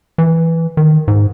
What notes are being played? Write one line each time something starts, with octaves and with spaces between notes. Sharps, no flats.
E3
D#3
G#2